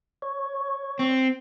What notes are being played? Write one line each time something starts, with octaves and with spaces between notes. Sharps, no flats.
C#5
C4